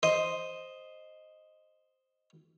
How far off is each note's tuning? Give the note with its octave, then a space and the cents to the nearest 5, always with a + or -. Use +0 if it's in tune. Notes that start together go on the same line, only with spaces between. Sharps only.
C5 +0 D#5 +0